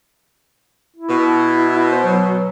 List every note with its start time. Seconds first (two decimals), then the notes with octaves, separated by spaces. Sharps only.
0.96 E4
1.09 B2
1.91 C5
2.05 F#3